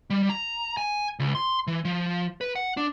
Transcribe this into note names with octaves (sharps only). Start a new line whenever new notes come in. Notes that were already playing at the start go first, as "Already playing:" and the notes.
G3
A#5
G#5
C#2
C6
E3
F3
B4
F#5
D4